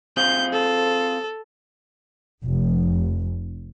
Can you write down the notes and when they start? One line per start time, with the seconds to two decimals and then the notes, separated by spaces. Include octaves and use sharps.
0.17 C4 F4 G#4 G6
0.53 A4
2.45 F1